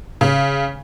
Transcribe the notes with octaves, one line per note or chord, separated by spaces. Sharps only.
C#3